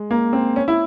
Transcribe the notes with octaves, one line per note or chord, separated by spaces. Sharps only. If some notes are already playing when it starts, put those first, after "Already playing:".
Already playing: G#3
A#3
C4
C#4
E4